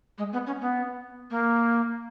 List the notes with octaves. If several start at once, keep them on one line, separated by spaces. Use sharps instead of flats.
G#3
B3
C#4
B3
A#3